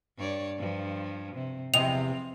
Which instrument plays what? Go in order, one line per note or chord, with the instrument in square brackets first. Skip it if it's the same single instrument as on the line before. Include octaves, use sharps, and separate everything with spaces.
[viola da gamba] G2 C#5 D5
G2 F3
C3
[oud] E2 C3 D#5 [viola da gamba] F3 C4 [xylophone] F7